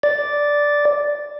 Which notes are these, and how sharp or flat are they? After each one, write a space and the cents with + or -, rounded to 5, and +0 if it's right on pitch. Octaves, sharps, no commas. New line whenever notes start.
D5 -5